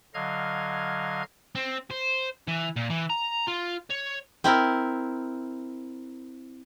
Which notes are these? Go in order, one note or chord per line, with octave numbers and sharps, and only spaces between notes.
D3 F#3 D#5 F5 F6 G#6
C4
C5
E3
A#2
E3
A#5
F4
C#5
C4 E4 A#4